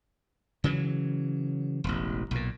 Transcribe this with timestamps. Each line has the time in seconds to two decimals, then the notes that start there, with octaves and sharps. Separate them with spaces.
0.64 C#3 E3 F#3
1.84 E1 A1
2.31 B1 A#2